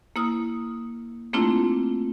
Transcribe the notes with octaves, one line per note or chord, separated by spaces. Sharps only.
A#3 E4 D#6 F6
A3 A#3 C4 D4 E4 F4